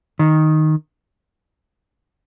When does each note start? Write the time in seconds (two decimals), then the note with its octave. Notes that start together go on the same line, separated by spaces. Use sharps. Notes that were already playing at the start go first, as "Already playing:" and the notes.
0.19 D#3